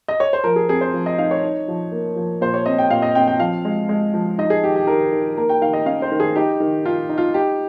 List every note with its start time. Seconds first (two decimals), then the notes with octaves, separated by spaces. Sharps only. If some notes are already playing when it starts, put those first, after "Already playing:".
0.08 D#5
0.20 C#5
0.33 C5
0.44 F3 A#4
0.56 G#4
0.69 C4 G#4
0.81 C5
0.94 F3
1.06 D#5
1.18 D#4 F5
1.31 C#5
1.43 D#4
1.68 F3
1.92 A#3
2.16 F3
2.41 A#2 C5
2.54 C#5
2.66 C4 D#5
2.78 G5
2.90 A#2 F5
3.02 D#5
3.15 C4 G5
3.27 G5
3.40 F3 F5
3.65 G#3
3.89 G#3
4.14 F3
4.38 D#4 D#5
4.50 G#4
4.64 D#3 G4
4.76 G4
4.87 D#3 A#4
5.12 D#3
5.37 A#3 A#4
5.49 G5
5.61 D#3 F5
5.73 D#5
5.86 C#4 F5
6.02 C5
6.12 D#3
6.20 G#4
6.36 D#4 G4
6.60 D#3
6.85 D#3 F4
7.09 D#4
7.18 F4
7.34 D#4 G4